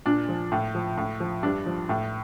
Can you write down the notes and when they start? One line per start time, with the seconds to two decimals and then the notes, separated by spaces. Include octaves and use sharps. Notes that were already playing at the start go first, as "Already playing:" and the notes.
0.06 A#2 D4
0.29 F3
0.52 A2
0.75 F3
0.97 A2
1.20 F3
1.43 G2 D4
1.66 F3
1.89 A2